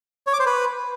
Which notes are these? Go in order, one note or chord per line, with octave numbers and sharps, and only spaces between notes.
C#5
D6
C5
B4